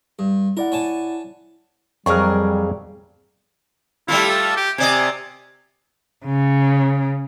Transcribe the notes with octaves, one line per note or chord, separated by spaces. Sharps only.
G2
E4 A#4 D5 F#5
C#5 G#5 A5
F2 F#3 G3 G#4 A#4 D5 C#6 F6
G3 A3 E4 F4
A4
G4
C3 D5 D#5 G#5
C#3